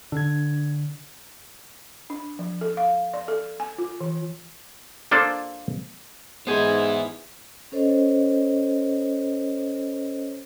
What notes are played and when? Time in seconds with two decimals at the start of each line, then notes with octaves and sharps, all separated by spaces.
0.12 D3 D4 G#6
2.10 D4
2.39 F3
2.61 A4
2.77 F5
3.14 D5
3.28 A4
3.60 G#5
3.78 F4
4.01 E3
5.11 A#3 D4 F4 A4 C5 D5
6.47 G#2 B3 E4 G#4 C5
7.72 C#4 A4 C5 C#5 D#5